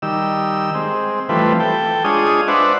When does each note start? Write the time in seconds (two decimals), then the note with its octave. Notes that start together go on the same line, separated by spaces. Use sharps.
0.02 D#3 G3 E6
0.74 G#3 C4
1.29 E3 F3 G3 A3 C4 B4
1.60 A4 G5
2.04 G#3 D4 F4 G#4 C#5 D#6
2.48 D4 B4 C5 D5 E5 F#5